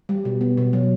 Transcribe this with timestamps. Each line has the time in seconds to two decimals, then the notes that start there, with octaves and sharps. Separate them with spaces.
0.09 G3
0.25 B2
0.41 B3
0.57 B2
0.73 F#3